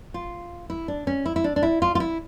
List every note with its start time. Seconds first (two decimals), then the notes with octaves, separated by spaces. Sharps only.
0.14 F4
0.70 E4
0.88 D4
1.07 C#4
1.26 E4
1.36 E4
1.44 D4
1.56 D4
1.63 E4
1.82 F4
1.95 F4
2.00 E4